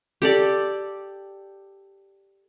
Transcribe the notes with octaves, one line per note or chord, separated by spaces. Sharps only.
G4 A4 D5